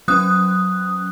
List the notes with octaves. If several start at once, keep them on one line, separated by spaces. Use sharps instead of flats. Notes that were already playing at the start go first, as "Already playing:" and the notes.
F#3 C#4 D#6 F#6